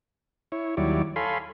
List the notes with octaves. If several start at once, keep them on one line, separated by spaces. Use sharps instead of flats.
E4 C#5
D#2 F#3 G3 E4 C#5 D5
A4 C#5 F5 G#5 B5 C6